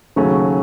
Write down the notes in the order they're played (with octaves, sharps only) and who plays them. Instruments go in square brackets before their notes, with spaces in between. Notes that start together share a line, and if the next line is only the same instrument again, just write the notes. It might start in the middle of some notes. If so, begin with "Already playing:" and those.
[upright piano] D#2 C#3 F#3 A3 C#4